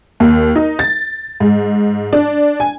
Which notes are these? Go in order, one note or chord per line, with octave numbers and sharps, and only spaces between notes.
D#2
D#4
A6
G#2
D4
G#5